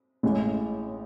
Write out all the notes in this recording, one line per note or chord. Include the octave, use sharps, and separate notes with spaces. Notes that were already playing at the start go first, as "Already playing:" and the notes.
A1 A2 G#3